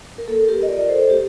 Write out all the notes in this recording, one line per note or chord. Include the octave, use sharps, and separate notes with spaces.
A#4
A#3 A4
G4 A#4
D#5
F4 A#4 D5
A4 C5
A#3 G4